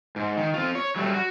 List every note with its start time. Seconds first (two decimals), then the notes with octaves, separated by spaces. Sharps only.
0.16 G#2
0.37 D#3
0.54 C4 F4
0.75 C#5
0.96 F#3 G3 A3
1.14 F#4